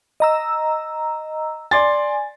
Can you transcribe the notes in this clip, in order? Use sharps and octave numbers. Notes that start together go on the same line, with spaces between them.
D#5 A#5 E6
D5 G#5 C6 A6